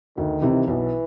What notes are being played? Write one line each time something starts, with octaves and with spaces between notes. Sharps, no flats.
D2 D#3
C3 E3
B1 E3